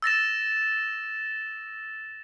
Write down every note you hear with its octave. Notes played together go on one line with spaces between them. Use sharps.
E6 A6 A#6 E7